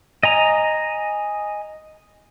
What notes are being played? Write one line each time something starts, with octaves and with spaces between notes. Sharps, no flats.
D#5 G#5 A#5